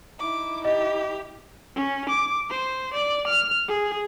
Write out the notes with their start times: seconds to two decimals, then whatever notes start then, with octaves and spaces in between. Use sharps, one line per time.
0.20 D#4 E4 D6
0.65 G4 D#5
1.76 C#4
2.09 D6
2.50 C5
2.93 D5
3.27 F6
3.68 G#4